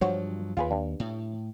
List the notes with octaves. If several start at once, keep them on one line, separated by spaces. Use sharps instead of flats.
G2 F3 F#3 F#4 C5 C#5
D#2 F4 G#4 B4
G2
A2